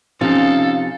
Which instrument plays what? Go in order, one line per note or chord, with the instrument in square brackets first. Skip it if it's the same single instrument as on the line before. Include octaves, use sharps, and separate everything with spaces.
[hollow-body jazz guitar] C3 F3 [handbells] C#4 D#4 [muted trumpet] A4 [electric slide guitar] F5